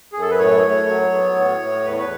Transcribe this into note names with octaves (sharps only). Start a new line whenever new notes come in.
F#2 G#4
A4
B4
A2 C#5
A2
F#3
B3
A2
A2
E2 B4
C#5
B4